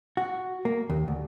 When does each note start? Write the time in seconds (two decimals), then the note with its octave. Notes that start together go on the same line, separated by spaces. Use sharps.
0.17 F#4
0.65 A#3
0.90 D#2
1.08 D2